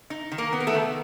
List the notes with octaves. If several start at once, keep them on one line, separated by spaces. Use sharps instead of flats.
D#4
D#3
A#3 A#4
B3
A#4
A3 A4
D#3